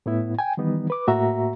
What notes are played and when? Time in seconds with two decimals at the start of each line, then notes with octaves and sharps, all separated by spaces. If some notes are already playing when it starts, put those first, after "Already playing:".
0.06 A2 B3 E4
0.39 G5 G#5
0.57 D#3 E3 G3 B3 D#4
0.90 B4 D6
1.07 A2 A#3 F#4 E5 A#5